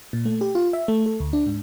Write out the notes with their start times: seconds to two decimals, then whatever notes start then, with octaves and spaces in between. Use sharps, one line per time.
0.13 A#2
0.25 A3
0.41 G4
0.55 F4
0.73 E5
0.88 A3
1.06 A4
1.20 D2
1.33 D4
1.46 G#2